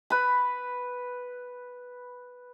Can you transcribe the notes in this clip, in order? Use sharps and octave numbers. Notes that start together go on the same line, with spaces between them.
B4 B5